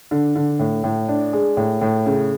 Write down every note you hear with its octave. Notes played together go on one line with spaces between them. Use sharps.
D3
D3
A2
A2
D4
G#3
A2
A2
C#3